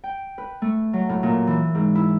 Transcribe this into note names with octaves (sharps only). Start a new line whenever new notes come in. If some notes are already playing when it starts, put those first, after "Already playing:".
G5
B4
A3
F#3
A2
A#2
E3
G#2
E4